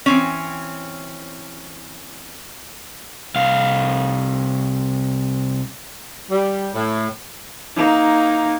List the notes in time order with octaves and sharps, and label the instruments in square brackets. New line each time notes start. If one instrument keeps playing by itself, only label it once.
[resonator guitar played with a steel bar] E3 C4 C#4
[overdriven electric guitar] C2 F5
[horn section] G3
A2
[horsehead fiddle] A#3 D#4